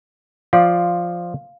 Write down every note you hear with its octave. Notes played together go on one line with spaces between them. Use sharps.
F3 F4 D5 F5